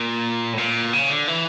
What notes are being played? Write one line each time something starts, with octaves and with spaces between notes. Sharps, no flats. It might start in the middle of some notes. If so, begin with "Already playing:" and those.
Already playing: A#2
A2
A#2
C#3
D3
E3